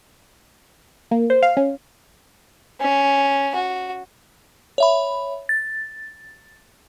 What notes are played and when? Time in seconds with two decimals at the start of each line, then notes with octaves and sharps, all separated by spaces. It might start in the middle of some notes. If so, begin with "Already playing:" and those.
1.11 A#3
1.30 C5
1.43 F5
1.57 C#4
2.81 C#4
3.55 F#4
4.78 C#5 E5 B5
5.49 A6